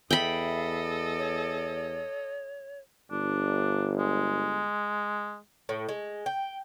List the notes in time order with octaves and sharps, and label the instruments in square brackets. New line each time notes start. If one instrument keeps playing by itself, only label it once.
[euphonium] E2 [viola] A4 D#5 [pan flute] E5 [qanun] G5 B5
[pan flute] C#5
[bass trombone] G1 [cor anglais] D4
[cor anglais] G#3
[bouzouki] A2
G#3
G5